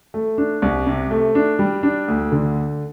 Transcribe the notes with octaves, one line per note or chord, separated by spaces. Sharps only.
A3
D4
C2
C3
A3
D4
G3
D4
D2
D3